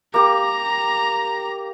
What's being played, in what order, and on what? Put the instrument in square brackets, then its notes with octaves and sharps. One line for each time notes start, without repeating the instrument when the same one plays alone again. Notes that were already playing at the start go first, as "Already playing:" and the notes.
[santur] A#3 G4 [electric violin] A#5